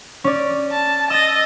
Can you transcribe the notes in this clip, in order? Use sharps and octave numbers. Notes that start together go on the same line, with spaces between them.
C#4 D5
A5
D#5 E6 A6